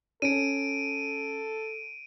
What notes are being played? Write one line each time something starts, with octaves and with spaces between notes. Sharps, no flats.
C#4 A4 D7 D#7